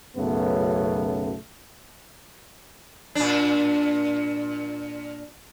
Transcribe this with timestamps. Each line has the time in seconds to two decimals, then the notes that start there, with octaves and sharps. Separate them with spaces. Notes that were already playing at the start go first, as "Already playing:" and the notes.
0.17 B1 F#2 C#3 A3 B3
3.15 A#2 D4